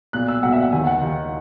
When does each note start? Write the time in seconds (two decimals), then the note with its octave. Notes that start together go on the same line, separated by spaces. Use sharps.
0.13 B1 A#2 F#6
0.28 E6
0.43 B1 A#2 F#5
0.52 E5
0.62 F#5
0.72 D#2 D#3 G#5
0.87 F#5
1.01 D#2 D#3